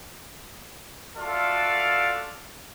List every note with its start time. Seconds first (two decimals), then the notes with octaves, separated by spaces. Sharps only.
1.17 F4 F#4 A4 D5 E5 F5